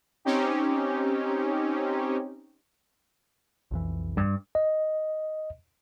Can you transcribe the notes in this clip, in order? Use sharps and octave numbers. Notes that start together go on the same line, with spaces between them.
C4 C#4 D#4 G4
B1 F2 E3
G2
D#5